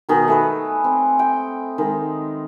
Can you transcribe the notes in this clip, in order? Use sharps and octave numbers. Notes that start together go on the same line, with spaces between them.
B2 D#3 G#4
A3 G#4 B4
C4
G5
D#3 G#3